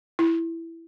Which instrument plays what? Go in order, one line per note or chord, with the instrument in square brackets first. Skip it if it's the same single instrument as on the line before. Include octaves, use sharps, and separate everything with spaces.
[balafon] E4